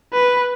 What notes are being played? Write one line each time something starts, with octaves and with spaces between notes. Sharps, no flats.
B4